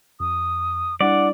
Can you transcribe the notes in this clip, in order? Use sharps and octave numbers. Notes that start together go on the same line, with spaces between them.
F2 D#6
G3 D4 E4 D5 F#5